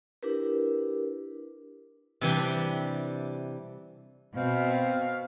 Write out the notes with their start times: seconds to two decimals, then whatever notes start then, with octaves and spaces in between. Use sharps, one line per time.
0.23 D4 E4 G4 A#4 B4
2.21 C3 E3 G3 D4
4.36 B2 C4 F5